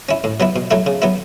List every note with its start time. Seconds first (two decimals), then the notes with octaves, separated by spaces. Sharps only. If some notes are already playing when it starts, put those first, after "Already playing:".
0.09 C#4 E4
0.24 A2
0.40 F#3 B3 E4
0.56 B2
0.71 F#3 A3 E4
0.86 C#3
1.02 F#3 B3 E4